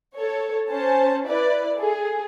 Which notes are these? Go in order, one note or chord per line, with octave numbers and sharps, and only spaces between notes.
A4 C#5
C#4 C5 A5
E4 B4 D5
G#4 A4